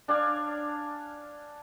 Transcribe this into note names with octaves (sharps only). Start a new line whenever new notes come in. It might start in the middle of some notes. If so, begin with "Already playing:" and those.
D4 D5 F5 G#5